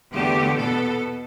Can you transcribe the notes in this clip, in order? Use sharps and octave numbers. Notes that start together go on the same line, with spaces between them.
E2 D3 A3 G4
B2 B3 A4